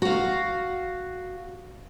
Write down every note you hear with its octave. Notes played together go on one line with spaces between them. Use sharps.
F#4 F5